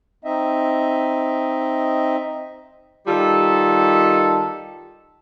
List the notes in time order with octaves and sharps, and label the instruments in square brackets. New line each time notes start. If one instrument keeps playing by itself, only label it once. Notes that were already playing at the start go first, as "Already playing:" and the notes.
[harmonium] C4 D#4 D#5 E5
[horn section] D#3 G3 F4 A4